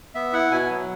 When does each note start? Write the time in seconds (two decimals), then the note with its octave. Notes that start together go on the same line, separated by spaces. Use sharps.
0.15 B3 E5
0.33 E4 F#5
0.51 B2 G#5
0.70 F#3